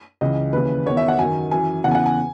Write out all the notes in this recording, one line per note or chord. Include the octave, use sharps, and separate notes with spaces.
C#2 C#3 E3 D#5
D#2 C#3 E3 B4
E2 D#3 C#5
E5
F#5
F#2 D#3 G#5
F#2 E3 G#5
E2 C#3 E3 F#5
G#5
F#5
G#5